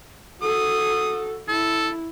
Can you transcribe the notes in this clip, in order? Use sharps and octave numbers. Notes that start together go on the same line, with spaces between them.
F#4 A4 D#6
E4 A4